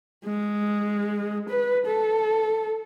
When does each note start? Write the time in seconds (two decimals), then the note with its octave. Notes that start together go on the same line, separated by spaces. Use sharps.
0.25 G#3
1.50 B4
1.86 A4